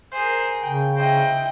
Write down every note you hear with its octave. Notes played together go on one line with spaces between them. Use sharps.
G#4 A#4 C5
C#3 G5
E4 C5 D#5 G5